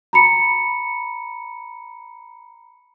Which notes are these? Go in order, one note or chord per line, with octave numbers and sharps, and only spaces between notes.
A#5 B5 C#7